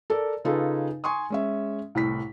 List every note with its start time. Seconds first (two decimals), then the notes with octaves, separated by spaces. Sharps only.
0.10 A4 A#4 D5
0.45 C#3 D#4 F4 G#4 A4 B4
1.04 G#5 C6 C#6 D#6
1.30 G#3 C#4 E5
1.95 C2 A2 B6